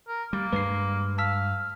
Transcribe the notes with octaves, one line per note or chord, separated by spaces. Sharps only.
A#4
G3 A#3
G2 G#3 B4 C7
F5 A5 E6 B6